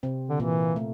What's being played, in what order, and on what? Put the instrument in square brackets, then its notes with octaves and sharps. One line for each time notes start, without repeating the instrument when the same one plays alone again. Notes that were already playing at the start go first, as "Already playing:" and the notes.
[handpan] C3 C4
[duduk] D3
[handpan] A#2 A#3 [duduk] E3
[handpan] A3